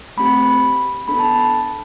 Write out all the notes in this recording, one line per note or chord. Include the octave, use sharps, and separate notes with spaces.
A3 C4 G4 B5
B3 D4 A4 B5
A5